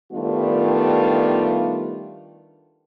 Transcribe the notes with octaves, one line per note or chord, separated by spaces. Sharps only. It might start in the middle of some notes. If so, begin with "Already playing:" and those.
D#3 G3 A3 B3 D4 F4